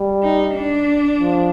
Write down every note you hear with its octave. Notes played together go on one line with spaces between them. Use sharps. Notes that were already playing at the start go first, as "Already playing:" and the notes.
Already playing: G3
D#4
D4
F3